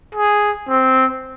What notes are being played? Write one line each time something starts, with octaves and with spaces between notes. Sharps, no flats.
G#4
C4